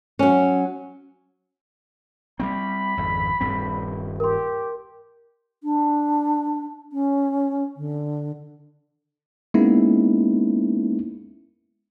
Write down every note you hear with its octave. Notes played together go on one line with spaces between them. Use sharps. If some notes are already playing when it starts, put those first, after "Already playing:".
F#3 C#4
G3 A#3 C4 B5
G#1 F2
D#1 G2 C4
G4 A#4 C6
D4
C#4
D3
G#3 A#3 B3 C#4 D#4 E4